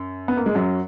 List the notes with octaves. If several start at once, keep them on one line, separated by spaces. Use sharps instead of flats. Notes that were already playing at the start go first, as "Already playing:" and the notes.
Already playing: F#2
B3
A#3
G#3
F#2 F#3